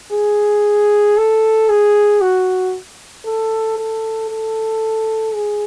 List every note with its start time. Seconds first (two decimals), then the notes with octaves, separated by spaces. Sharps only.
0.13 G#4
1.17 A4
1.69 G#4
2.21 F#4
3.26 A4
3.78 A4
4.30 A4
5.34 G#4